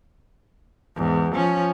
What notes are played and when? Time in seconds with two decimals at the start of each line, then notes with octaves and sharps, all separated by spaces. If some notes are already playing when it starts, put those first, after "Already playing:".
0.96 E2 G#2
1.32 F3 C#4